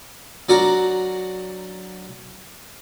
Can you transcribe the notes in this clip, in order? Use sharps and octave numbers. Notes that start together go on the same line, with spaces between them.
F#3 D4 F#4 A#4